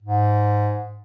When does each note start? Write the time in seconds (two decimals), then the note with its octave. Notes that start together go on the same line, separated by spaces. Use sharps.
0.02 G#2